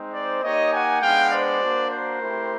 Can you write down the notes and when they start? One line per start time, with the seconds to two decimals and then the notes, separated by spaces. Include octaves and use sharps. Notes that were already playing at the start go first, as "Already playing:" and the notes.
Already playing: G#3 C4 D#4
0.13 C5 D5
0.42 A#3 D#4 G4 C#5 D#5
0.72 F#5 G#5
1.01 G#3 B3 D4 F5 G5
1.31 C5 D5
1.61 A#3 D4 F#4
1.90 A#4 C5
2.20 A3 C4 E4 G4